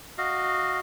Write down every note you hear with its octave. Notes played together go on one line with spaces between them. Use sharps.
F#4 D#5 F5